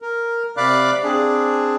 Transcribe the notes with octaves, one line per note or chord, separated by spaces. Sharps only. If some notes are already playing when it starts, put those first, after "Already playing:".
A#4
C3 D5 F5 B5 D6 F#6
C4 D4 G#4